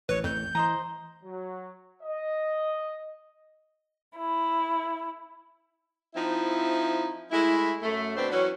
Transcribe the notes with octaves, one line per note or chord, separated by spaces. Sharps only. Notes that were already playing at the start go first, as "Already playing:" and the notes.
A1 B4 C#5
F2 G6
E3 C5 D#5 A#5
F#3
D#5
E4
F3 C4 D#4 E4
G#3 A3 E4
F#2 A3
B2 C4 D4 B4 C5
E3 F#3 C#4 F#4